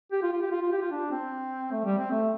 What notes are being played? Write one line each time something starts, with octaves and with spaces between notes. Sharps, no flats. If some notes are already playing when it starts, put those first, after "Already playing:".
G4
F4
F4
G4
F4
F4
G4
F4
D4
C4
A3
G3
C4
A3